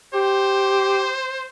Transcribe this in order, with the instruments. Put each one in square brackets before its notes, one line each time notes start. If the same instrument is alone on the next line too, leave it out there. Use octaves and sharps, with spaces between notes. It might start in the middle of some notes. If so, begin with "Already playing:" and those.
[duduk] G4 [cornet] C5